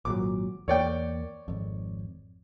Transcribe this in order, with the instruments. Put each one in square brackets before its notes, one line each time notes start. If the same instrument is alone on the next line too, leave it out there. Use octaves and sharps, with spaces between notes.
[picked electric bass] G#1 A#2 F#3 [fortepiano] D6
[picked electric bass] E2 A#3 [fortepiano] C#5 D5 G5
[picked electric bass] G#1 F2